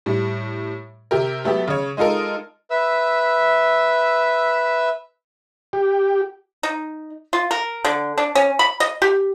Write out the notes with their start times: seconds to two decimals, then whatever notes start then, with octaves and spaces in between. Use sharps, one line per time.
0.06 A2 G3
1.11 C3 G4 A#4
1.44 F#3 A3 B3 G4
1.68 C#3 C#5
1.97 G#3 D#4 F4 A4 A#4
2.70 B4 E5 E6
5.73 G4
6.63 D#4
7.33 F4
7.51 A#4
7.85 D3
8.18 D4
8.35 C#4
8.59 B5
8.80 D#5
9.02 G4